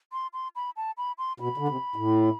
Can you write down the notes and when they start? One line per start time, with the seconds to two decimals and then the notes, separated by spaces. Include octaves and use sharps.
0.12 C6
0.33 C6
0.56 B5
0.77 A5
0.97 B5
1.18 C6
1.40 B2 B5
1.58 D3
1.68 C3
1.96 A2